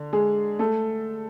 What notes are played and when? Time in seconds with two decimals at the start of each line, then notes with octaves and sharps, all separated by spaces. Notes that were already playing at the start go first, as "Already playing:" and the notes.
Already playing: D3
0.13 G#3 G#4
0.59 A3 A4